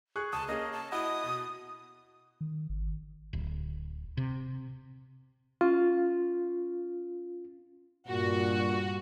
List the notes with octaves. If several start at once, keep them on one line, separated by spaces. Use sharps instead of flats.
G#4 C#6 F#6
C#2 A5 D#6
A#3 C#4 G#4 D#5
A5
E4 F#4 D#5 D#6
B2
D#3
G#1
D1
C3
C#4 F4
G2 A#2 F#4